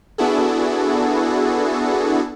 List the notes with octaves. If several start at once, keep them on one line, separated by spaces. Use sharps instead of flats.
B3 D4 E4 F#4 G#4 A4